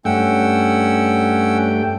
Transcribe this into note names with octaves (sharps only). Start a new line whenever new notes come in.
G2 A3 C#4 F#5 G5 E6